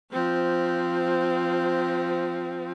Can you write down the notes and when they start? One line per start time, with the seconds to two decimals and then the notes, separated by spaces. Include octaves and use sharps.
0.12 F3 C4